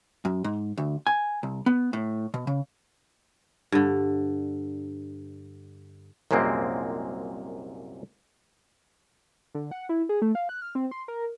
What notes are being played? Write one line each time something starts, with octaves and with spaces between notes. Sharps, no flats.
F#2
G#2
D2
G#5
C2
B3
A2
B2
C#3
G2 D3
C2 F#2 A#2 G#3 A#3 C4
D3
F#5
E4
G#4
A3
F5
F#6
F6
C4
C6
A#4